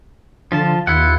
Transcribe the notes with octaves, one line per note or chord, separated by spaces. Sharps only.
D3 F3 F4 A5
D#2 E4 F4 F#5